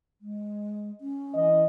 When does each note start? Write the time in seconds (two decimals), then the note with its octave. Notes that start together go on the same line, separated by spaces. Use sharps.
0.21 G#3
1.01 C#4
1.34 E3 D#5